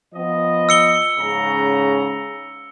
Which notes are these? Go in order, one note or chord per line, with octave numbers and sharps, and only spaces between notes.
F3 B3 D#5
E6 C#7 G7
G#2 C#3 A#5